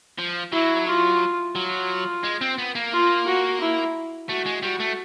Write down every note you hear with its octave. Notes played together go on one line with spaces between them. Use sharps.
F3
F#3 E4
F4
F#3 F4
G#3
C4
B3
A#3
F4
F#4
E4
A3 F#4
G#3
G3 F#4
A3